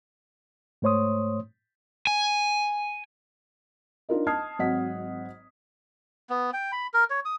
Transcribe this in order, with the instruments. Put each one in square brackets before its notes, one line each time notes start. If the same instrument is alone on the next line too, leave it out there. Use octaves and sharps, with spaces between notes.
[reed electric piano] G#2 A3 C5 C#5 C6 D#6
[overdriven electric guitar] G#5
[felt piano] D4 D#4 F4 A#4 D#5
D#5 A5 D#6 F6 G#6 C7
G#1 F#3 C4 D#5 F#5 B6
[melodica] B3
G5
B5
A#4
C#5
D#6